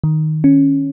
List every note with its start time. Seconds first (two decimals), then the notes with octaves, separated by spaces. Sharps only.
0.04 D#3
0.44 C#4